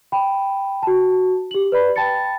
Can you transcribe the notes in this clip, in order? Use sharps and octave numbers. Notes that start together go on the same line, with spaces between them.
G5 B5
F#4 A5
G4 F#7
B4 D5 B5
G5 A5 B5 A6 C#7